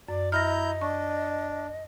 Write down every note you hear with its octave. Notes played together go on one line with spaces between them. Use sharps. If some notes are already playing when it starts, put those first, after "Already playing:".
F#2 D5
E4 D#5 A#5 F6 G6 A#6
D4 C#6